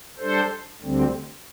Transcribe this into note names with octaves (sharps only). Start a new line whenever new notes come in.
G3 D4 A4 C5
D2 D3 G3 C4